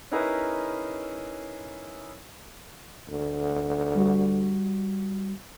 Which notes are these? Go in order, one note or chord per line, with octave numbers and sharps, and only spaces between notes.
C#4 D#4 E4 G#4 A#4 B4
D2
G3 F#4